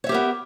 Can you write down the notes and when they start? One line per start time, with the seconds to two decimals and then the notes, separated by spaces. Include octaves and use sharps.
0.04 C#5
0.07 E5
0.09 G4
0.12 A#4
0.14 B3